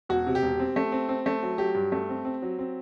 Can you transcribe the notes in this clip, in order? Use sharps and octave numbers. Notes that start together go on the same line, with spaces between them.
E1 F#4
C3
G4
E1
C4
A3
C4
C4
A3
F#3
F#3 G4
G2
A3
C4
C4
F#3
C4